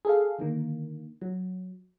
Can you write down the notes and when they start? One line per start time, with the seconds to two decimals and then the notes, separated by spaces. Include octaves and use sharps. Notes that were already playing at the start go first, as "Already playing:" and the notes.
0.05 G#4 A4 F5
0.39 D3 D#3 A#3
1.22 F#3